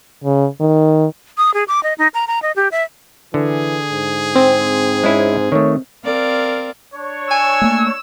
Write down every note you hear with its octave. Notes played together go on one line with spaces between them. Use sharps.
C#3
D#3
D#6
G#4
D6
D#5
D#4
A#5
A#5
D#5
G4
E5
D3 E3 G#4
G#2
C4
G#3 C#4 E4
D#3 A3 C#5
C4 A#4 D5 F5
D4 C#5
G#5 E6
A3 A#3